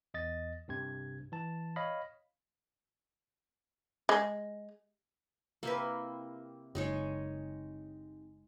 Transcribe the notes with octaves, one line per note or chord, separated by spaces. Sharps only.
E2 D#5 A6
C2 G2 C3 G#6
E3 A5
C#5 D#5 F5 B5
G#3
C3 A#3 E4 B4
F#1 G#3 D#4 C#5